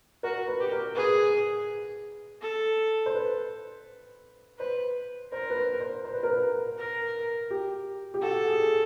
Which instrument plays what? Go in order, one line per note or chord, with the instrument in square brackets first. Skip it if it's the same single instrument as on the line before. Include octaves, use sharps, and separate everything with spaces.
[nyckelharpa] F#4 [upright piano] A#4
[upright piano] B4
[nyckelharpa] G4
[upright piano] A#4
[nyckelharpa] G#4 [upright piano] B4
[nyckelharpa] A4
[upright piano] C5
B4
[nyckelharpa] B4 [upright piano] C5
[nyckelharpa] A#4 [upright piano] C5
[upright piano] B4
C5
C5
C5
B4
A#4
B4
[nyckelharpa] A#4
[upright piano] G4
G4
[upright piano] F#4 [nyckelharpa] A4
[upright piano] G#4
G#4